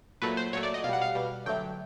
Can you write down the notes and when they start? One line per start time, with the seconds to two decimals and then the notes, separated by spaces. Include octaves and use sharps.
0.22 A#2 F#3 A3 B4
0.37 C5
0.53 A#2 F#3 A3 C#5
0.63 D5
0.74 D#5
0.84 B2 F5
0.89 G3 F#5
1.02 F5
1.15 B2 G3
1.46 D3 F#3 A3 G5